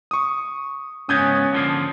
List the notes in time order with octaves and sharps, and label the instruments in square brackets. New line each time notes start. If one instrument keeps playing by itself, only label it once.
[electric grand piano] C#6 D#6
[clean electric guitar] G#2 C#3 B3 [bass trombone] C#4 [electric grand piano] D#6 G6 G#6
[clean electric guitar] D3 F3 A#3